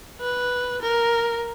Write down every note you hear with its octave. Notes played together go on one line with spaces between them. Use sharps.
B4
A#4